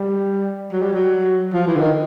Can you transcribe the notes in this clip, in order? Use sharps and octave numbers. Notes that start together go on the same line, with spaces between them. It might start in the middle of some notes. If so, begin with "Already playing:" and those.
Already playing: G3
F#3
G3
F#3
F3
E3
D3
D#3